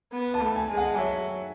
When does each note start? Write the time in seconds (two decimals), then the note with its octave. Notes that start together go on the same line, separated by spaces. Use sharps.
0.12 B3
0.34 A5
0.41 A3
0.56 G#5
0.70 G#3
0.77 F#5
0.98 F#3 E5